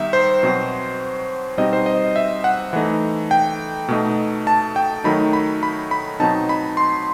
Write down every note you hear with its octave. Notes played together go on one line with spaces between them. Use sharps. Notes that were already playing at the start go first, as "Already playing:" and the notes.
Already playing: D#3 G3 B3 D#4 E5
C5
B2 F#3 C4
B2 G3 C4 D#4 D#5
C5
D#5
E5
F#5
E3 A3 D#4
G5
B2 A3 D#4
A5
G5
D#3 F#3 A3 D#4 B5
B5
B5
B5
B2 F#3 C4 D#4 A5
B5
C6